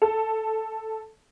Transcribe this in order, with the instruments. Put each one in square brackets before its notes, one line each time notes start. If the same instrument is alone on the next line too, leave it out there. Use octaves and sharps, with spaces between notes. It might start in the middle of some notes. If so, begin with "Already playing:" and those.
[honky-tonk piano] A4